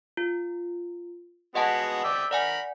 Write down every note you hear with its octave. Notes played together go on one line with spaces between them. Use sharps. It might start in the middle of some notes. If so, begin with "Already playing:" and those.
F4
G#3 B3 F#4 D#5 F#5 A5
D5 E5 G5
A#4 D5 F#5 G#5 B5